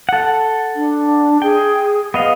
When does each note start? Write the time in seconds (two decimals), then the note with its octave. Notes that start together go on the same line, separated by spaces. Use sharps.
0.09 A4 F#5
0.75 D4
1.42 G#4 G5
2.14 B3 D#5 F5